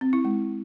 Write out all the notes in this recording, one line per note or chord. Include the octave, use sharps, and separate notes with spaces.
C4
E4
G#3